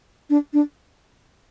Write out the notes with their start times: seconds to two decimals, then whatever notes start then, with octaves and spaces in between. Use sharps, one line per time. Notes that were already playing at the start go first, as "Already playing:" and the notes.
0.30 D4
0.53 D4